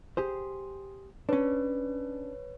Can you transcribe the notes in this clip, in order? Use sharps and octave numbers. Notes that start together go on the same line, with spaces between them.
G4 G#4 C5
C#4 D4 B4 C#5